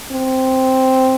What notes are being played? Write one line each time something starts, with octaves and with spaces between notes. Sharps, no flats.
C4